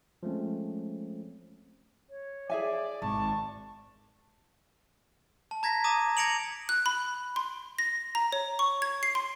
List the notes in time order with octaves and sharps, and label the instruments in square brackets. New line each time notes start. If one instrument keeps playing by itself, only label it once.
[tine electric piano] F3 G#3 A3 C4 C#4
[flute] C#5
[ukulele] G#4 E5 G#5 [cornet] D5
[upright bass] G#1 [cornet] A5 [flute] C#6
[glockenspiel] A5
A#5 G#6 A#6 B6
A#5 D6 D#6 D#7
G#6 A#6 C#7 D7 F7 F#7
[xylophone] F#6
B5
C6
A#6
A#5
C#5
C#6
G#6
C7
C6